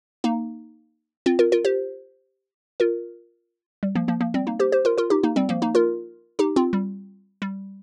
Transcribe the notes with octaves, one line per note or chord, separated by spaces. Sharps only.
A#3 D#4
C4 F4
F4 A#4
F4 A#4
G4 C5
F4 A#4
G3
F3 A#3
F3 A#3
F3 A#3
G3 C4
A#3 D#4
G4 C5
G4 C5
F4 A#4
F4 A#4
D#4 G4
A#3 D#4
G3 C4
F3 A#3
A#3 D#4
F4 A#4
D#4 G4
C4 F4
G3
G3